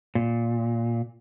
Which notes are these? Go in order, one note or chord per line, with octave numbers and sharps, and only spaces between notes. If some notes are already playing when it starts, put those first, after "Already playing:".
A#2